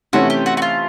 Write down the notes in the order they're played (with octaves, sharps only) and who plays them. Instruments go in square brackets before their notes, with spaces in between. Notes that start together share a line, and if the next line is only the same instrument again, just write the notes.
[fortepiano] C3 E3 A3 C#4 [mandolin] F#4
[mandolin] G4
F#4
F#4
F4